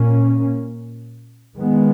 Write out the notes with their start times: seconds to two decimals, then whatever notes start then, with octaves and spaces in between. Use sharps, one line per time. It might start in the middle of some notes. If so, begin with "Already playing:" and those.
Already playing: A#2 A#3 C#4
1.56 D#3 G#3 B3